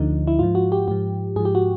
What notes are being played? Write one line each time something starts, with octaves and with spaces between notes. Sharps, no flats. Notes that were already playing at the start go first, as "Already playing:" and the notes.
Already playing: D2 D3 F3 D#4
E4
G#2 F3 F4
F#4
G4
G#2 F3 G4
G#2 F3 G#4
G4
F#4